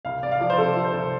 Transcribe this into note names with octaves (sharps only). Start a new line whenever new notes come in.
C2 F5
C2 D5
F5
F3 D5
C5
C3 A4
F3
C5
C2